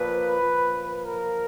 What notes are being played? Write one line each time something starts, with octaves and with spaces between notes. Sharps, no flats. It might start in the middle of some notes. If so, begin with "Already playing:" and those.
Already playing: A#2 F3 B4
A#2 F3
A#4